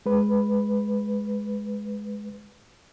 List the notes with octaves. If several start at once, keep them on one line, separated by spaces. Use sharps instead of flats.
G#3 B4